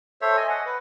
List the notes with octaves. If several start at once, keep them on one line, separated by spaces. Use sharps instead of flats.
A4 C5 C#5 E5
D#5 G#5
D#5 F#5
B4